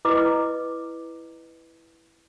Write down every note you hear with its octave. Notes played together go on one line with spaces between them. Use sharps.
E4 B4 D#5 D6